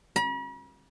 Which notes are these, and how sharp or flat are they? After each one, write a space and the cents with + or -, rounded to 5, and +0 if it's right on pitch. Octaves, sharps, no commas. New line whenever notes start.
B5 -45